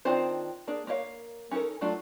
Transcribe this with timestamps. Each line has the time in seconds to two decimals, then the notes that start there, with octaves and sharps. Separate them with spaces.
0.05 D#3 C4 D4 F4 C5
0.68 A#3 D4 G#4
0.87 A#3 A#4 C#5 D#5 F5
1.51 C#4 D#4 F#4 A4 A#4
1.81 F#3 A3 D4 F4